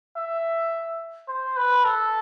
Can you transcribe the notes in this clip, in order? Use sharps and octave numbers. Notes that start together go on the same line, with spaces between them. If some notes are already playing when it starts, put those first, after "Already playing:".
E5
C5
B4
A4